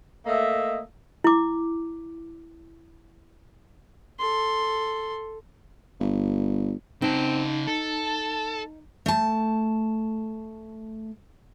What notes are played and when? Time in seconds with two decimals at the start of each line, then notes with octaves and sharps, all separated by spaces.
0.25 A3 A#3 D#5 E5
1.24 E4 D6
4.19 A4 C6
6.00 G1
7.02 C#3 C4 D#4 A5
7.67 A4 A5
9.06 A3 A5